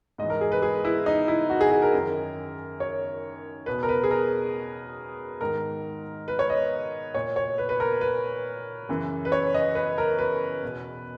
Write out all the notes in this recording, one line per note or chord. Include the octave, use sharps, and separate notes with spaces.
G#2 E3 D#5
A#4
G#4
B4
G#4
E4
D#4
E4
F#4
G#4
G#4
A#4
F#2 D#3
C#5
E2 B2 B4
A#4
B4
G#4
A#4
G#2 D#3 A#4
B4
C#5
D#5
A#2 C#5
C#5
B4
B4
A#4
B4
F#2 C#3 E3
B4
C#5
D#5
B4
A#4
B4
E2 B2